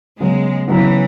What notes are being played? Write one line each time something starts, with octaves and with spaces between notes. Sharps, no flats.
C#3 F#3 G#3 B3
C#3 E3 F#3 B3